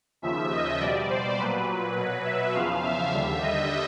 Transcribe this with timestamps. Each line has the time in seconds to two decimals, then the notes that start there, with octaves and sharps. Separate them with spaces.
0.22 D#2 C#3 F3 E5
0.51 D#5
0.80 B2 G3 D5
1.09 C5
1.38 A#2 F#3 B4
1.67 B4
1.97 B2 F#3
2.25 E5
2.54 E2 C#3 F3 F5
2.83 E5
3.12 D#2 D3 G3
3.41 D#5